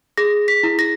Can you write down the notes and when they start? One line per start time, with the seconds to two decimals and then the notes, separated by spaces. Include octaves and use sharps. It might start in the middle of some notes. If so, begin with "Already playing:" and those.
0.17 G#4 A#6
0.48 B6
0.63 E4
0.79 A#6